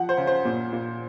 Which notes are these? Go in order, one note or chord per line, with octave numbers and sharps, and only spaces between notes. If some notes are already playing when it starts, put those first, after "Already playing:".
Already playing: F3 F#5
C5
C#3
C5
A#2
A#2